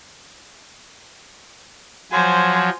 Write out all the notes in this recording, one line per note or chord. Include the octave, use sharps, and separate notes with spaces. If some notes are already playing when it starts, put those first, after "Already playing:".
F3 F#3 C5 G#5